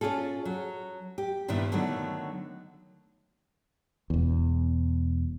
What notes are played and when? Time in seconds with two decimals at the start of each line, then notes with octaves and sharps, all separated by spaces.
0.01 C#4 D4 F4 G#4 A4
0.45 F#3
1.18 G4
1.48 G2 A#2 D#3 B3 D4 E4
1.72 D3 D#3 F#3 A3 B3 D4
4.10 E1 E2